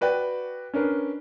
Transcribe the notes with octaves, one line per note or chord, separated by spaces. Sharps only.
F#4 B4 D5 G5
C#4 D4 A#4 B4